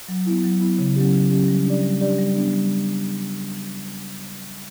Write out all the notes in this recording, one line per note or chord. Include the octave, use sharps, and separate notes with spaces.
F#3
B3 E4
F#3
B3 E4
C#3
F#3 C#4 G4
C#3
F#3 C#4 G4
G3
D4 G4 D5
G3
D4 G4 D5
G3
B3 D4
G3